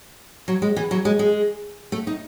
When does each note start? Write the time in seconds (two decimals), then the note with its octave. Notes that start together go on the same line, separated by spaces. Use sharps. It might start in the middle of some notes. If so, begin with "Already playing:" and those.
0.48 F#3
0.62 G#3
0.76 E3
0.91 F#3
1.05 G#3
1.19 G#3
1.92 A3
2.07 D#4